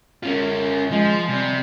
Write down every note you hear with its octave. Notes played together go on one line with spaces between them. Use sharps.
F#2 C#4 F4
F3 G#3
C3 G3